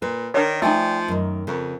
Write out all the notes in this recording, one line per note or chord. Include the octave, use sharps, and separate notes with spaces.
A#2 B4
D#3 D4 A#4 C#5
F3 A3 D#4 D5 G5 G#5
F#2 D#3
F2 C#3 A#4